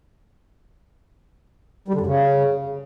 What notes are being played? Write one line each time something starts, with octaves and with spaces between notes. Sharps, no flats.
G3
D3
F#2
C#3